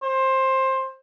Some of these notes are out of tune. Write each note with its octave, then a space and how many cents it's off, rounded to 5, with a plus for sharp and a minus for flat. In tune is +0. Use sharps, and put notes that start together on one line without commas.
C5 +20